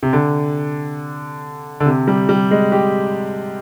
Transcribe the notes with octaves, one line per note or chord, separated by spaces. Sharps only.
C3
D3
D3
C3
G3
G3
G#3
G4